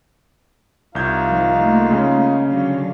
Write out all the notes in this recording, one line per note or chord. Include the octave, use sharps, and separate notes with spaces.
C2 D#4 F4 F5 G6 G#6
D#3 F3
A3 A#3
C#3 G#3 C#4
D3 F#3 F5